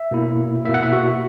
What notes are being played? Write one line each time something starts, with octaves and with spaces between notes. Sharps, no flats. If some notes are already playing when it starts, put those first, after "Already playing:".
Already playing: E5
B2 A#3 E4
B2 A#3 E4 E5
F#5
E5
F#4